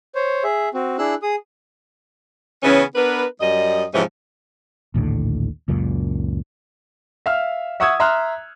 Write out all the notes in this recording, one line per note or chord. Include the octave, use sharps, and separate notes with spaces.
C5 C#5
G#4 E5
C4 F#4
D4 E4 G#4 E6 F#6
G#4 D#6
C#3 E3 B3 C#4
B3 D4 A#4 B4
F#2 G3 D#5
G#2 C3 E3 F3 C#4
A#1 D#2 A2 D3
C#2 F#2 A#2
E5 F5 F6
E5 F#5 C#6 D#6 E6 G#6
E5 A#5 C6 F6 F#6